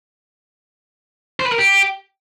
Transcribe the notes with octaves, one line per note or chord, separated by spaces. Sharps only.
C5
B4
A#4
G4